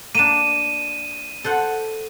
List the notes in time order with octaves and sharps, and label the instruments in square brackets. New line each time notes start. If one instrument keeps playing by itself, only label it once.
[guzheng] A#3 D4 [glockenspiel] D#7 E7
[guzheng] A4 C5 F#5